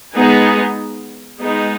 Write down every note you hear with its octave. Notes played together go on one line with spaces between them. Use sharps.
G#3 B3 D#4 G#4
G#3 B3 D#4